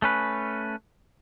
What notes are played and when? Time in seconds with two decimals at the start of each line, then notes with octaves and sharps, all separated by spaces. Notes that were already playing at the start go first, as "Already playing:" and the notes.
0.02 A3 C#4 B4